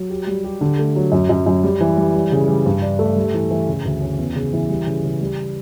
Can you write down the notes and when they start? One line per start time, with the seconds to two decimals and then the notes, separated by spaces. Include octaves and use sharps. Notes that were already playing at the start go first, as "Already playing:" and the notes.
Already playing: F#3
0.10 G4
0.27 G3
0.44 G4
0.61 D3
0.79 A3
0.96 F#3
1.12 F#2
1.29 F#2
1.46 F#2
1.63 G3
1.81 E3
1.97 G3
2.15 G3
2.32 C#3
2.48 G3
2.66 G2
2.82 D4
2.99 A3
3.17 G3
3.34 E3
3.51 E3
3.68 C#3
3.85 D2
4.02 C#4
4.18 E2
4.35 C#3
4.53 E3
4.69 G3
4.87 C#3
5.04 C#3
5.21 G3